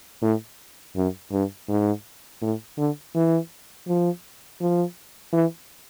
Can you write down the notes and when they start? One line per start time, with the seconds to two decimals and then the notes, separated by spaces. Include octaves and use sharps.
0.22 A2
0.96 F#2
1.32 G2
1.69 G#2
2.42 A2
2.78 D3
3.15 E3
3.88 F3
4.61 F3
5.33 E3